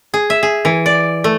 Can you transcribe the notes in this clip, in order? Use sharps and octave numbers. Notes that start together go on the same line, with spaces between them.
G#4
E5
G#4
E3
D5
A3